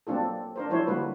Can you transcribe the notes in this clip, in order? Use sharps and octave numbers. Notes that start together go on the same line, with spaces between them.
F#3 A#3 C4 D4 F4 A4
D4 A#4 C5
F3 F#3 D4 E4 C5 C#5
D3 G3 A#3 F#4 B4